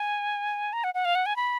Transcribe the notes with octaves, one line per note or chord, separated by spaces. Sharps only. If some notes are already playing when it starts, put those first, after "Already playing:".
Already playing: G#5
A#5
F#5
F#5
F5
F#5
G#5
B5